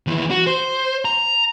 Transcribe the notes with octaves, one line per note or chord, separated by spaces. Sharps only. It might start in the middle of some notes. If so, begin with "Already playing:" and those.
D#2 E3
F#4
C5
A#5